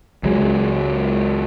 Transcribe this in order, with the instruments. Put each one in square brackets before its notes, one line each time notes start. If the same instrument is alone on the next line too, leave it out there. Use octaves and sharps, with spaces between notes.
[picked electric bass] C#2 F#3 G#3